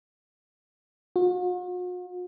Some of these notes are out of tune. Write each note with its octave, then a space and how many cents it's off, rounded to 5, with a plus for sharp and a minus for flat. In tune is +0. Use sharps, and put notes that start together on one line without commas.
F#4 -45